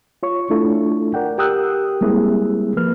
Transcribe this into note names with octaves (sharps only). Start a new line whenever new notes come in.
F4 C#5 C#6
A3 D4 E4 F4 A4
A#4 D5 F#5 G5
G4 A#4 G5 D#6 E6 F#6
G3 G#3 A#3 C4 E4 G#4
F3 A#3 B4 F6